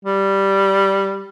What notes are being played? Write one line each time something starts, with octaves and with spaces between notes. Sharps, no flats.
G3